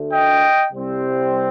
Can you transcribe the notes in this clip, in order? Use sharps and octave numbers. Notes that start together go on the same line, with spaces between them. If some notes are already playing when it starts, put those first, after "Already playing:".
Already playing: D2 D3 A3
D#5 G5
C2 C3 G3 C4